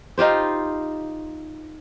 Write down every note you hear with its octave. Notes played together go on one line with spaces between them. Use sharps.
D#4 F4 G4 C5